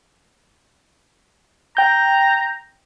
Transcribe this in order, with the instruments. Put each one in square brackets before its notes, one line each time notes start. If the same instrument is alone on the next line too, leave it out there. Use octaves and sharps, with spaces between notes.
[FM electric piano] G5 G6 [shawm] A#5